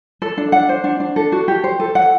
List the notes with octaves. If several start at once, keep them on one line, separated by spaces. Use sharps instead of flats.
A4
D4
F#5
C5
D4
D4
A4
F#4
G4
C5
A4
F#5